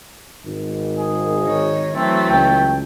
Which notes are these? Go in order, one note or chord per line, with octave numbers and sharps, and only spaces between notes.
G#1
G#4
D#3 C#5
E3 F#3 A3 C4
C#2 G5